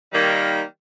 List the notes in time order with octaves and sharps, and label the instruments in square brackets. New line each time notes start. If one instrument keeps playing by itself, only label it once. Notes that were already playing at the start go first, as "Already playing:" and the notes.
[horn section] D#3 G3 A#3